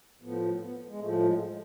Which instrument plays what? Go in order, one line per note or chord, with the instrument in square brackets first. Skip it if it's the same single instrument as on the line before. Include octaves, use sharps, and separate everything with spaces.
[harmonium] A2 F3 B3
B3
G#3
A2 F3 A3
A3
G#3